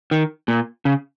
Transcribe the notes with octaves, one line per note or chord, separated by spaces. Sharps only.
D#3
A#2
C#3